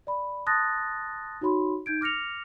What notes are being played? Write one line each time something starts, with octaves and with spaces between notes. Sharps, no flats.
D5 B5
A5 C6 D#6 F#6 A6 A#6
D#4 F#4 C#5 B5 C6
D#4 G6 G#6 D7
D6 F6 A#6 C#7 F7